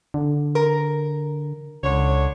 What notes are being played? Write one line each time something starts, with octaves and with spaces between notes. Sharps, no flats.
D3
A#4
C#2 D3 C#5